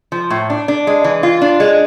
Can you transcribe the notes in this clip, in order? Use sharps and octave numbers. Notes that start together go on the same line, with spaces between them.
F3
A2
D4
D4
G#3
E3
F4
D4
G#3